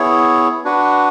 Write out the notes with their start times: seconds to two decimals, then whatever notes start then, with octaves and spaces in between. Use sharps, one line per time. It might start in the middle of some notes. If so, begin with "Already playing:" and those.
Already playing: B3 E4 G#4 C#5
0.65 D4 F#4 B4 F#5